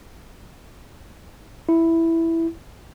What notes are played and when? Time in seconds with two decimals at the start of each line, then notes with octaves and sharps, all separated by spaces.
1.69 E4